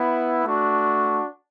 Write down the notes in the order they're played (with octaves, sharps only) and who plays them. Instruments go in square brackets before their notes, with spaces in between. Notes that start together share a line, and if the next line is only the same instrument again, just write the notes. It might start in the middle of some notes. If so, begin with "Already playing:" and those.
Already playing: [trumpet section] B3 E4
A3 D4 F#4